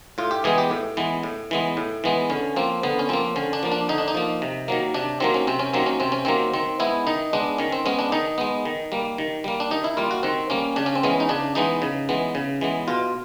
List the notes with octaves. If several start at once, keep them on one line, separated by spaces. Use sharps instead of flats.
A2 F4
G4
E3 G#3 B3 G#4
G4
A2
E3 G#3 B3
A2
E3 G#3 B3
A2
E3 G#3 B3
D3 C#4
F3 A#3 C4
D3 B3
C#4
F3 A#3 C4
D3 C#4
D4
F3 A#3
D4
D3 D#4
D4
D#4
F3 A#3
C3
D#3 F#3 A#3
C3 D4
D#3 F#3 A#3 C4
C#4
C3 C4
C#4
D#3 F#3 A#3 C4
C#4
C3 C4
C#4
D#3 F#3 A#3 C4
D#3 C4
G#3 B3 E4
D#3 D#4
G#3 B3 D4
D#3 C#4
C4
G#3 B3 C#4
D4
D#3 D#4
G#3 B3
D#3
G3 A#3
D#3
G3 A#3
D4
D#3 D#4
E4
G3 A#3 F4
F#4
D#3 C4
G3 A#3 C#4
C#3 D4
C#4
C4
E3 G#3 B3 C#4
D#4
C#3 D4
E3 G#3 B3 D#4
C#3
E3 G#3 B3
C#3
E3 G#3 B3
B2 F4